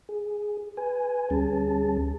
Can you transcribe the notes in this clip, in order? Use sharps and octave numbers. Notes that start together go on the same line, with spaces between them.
G#4
B4 G#5
D2 G3 C#4 G#4 A5